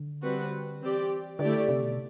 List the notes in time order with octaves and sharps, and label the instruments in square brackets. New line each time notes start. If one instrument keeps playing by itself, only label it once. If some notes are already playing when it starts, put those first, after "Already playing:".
Already playing: [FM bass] D3
[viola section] G3 C4 F#4 B4
[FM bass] E3 [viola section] C4 G4 D5
[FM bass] D3 [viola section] A3 E4 G4 D5
[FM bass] C3
B2